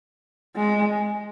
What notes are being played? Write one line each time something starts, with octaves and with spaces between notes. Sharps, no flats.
G#3